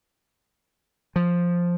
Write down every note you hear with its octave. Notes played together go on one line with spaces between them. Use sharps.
F3